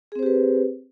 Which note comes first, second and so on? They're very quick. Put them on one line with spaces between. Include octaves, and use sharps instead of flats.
G#4 C4 C5 G4 B4